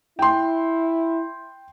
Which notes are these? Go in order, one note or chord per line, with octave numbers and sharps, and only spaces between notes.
E4 G5 C6